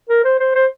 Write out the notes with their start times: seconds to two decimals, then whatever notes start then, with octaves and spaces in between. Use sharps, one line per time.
0.09 A#4
0.24 C5
0.40 C5
0.55 C5